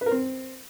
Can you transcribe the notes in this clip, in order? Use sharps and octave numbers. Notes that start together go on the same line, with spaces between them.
B4
A#4
C4